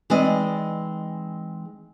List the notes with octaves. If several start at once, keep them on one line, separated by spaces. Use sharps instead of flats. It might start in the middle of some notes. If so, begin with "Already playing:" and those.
E3 G#3 C4 D#4 D5 D#5